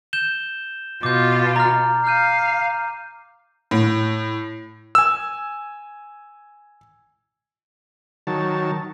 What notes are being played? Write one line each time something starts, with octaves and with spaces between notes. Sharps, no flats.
G6 E7 G7
B2 F4 D6 G6
A#5 F6
F5 F6 G6 D#7
A2
G#5 E6
D#3 F#3 A5